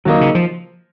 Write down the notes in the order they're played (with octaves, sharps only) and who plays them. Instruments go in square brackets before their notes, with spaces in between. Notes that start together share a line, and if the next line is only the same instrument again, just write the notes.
[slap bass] D#3 [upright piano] F#3 A#3 D#4
[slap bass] C#3
F3